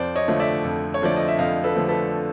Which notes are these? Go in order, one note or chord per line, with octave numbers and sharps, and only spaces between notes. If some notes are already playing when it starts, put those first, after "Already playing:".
Already playing: F2 C5 D5
C#5 D#5
D3 F3 A3
D5 E5
F2
C#5
D3 F3 A3 D5
D#5
E5
F2 D#5 F5
A4 B4
D3 F3 A3
A4 B4